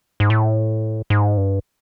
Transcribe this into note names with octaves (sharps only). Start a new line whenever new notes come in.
G#2
A2
G#2
G2